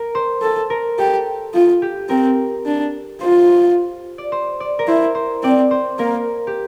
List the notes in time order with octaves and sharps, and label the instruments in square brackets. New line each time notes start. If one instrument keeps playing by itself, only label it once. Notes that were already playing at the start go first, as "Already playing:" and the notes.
Already playing: [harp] A#4
C5
[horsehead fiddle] A4
[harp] A#4
[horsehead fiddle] G4 [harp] A4
[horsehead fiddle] F4
[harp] G4
[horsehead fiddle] C4 [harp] A#4
[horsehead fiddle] D4
[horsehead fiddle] F4 [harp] C5
[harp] D5
C5
D5
A#4
[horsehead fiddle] E4 [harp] C5
[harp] C5
[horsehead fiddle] C4 [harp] D5
[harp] C5
[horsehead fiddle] A#3 [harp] A#4
[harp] G4